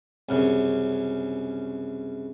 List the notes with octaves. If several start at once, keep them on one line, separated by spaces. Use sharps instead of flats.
C2 F#2 C#3